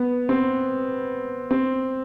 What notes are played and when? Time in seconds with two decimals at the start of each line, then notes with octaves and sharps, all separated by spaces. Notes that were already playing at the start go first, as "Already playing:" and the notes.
Already playing: B3
0.29 C4
1.51 C4